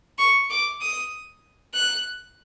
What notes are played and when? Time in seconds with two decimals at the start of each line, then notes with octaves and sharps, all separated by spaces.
0.18 C#6
0.50 D6
0.81 D#6
1.74 F#6